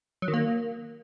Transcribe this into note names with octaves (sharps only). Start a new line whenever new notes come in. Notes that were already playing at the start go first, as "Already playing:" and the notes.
F#3
D#3
A#3